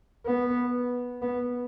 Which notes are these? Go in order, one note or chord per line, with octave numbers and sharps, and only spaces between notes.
B3
B3